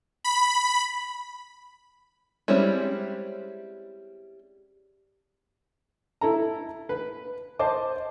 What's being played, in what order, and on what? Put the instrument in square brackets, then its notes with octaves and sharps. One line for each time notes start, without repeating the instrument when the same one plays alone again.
[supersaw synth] B5
[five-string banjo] G3 G#3 C4 C#4 E4
[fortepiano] E4 A4 A#5
B4
C5 D#5 A5 D6